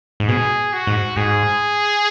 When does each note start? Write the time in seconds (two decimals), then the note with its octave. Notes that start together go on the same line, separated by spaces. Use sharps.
0.20 G#2
0.28 B2 G#4
0.73 F#4
0.87 G#2
1.17 G#2 G#4